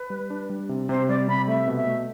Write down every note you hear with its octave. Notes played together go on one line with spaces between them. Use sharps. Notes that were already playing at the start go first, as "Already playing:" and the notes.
Already playing: B4
G3
D4
G3
C3
C3 C5
G3 D5
C3 B5
A3 E5
B2
E5
A3